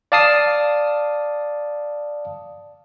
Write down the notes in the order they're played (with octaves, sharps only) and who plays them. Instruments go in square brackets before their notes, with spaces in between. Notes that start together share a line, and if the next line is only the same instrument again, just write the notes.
[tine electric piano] D5 F5 A5 D#6 C7